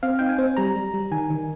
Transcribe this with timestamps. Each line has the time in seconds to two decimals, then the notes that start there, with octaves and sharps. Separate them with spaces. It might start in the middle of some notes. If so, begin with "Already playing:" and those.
0.03 C4 F5
0.19 D#4 G5
0.29 G#5
0.38 C4
0.57 G3 A#5
0.76 G3
0.94 G3
1.11 D#3 G#5
1.30 D#3